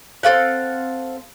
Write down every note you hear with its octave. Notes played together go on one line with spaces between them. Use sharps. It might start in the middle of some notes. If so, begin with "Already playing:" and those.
C4 A4 F5 F#5